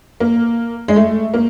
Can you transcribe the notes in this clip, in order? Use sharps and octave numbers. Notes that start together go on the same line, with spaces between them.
A#3
G#3
A3
A#3